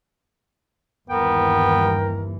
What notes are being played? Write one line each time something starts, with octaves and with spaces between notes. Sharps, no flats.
G1 D#2 E3 B3 A#4 G5